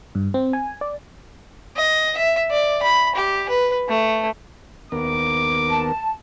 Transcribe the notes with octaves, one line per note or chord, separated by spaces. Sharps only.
G2
C4
G#5
D5
D#5
E5
D5
B5
G4
B4
A3
D#2 B3 A#4 D6
A5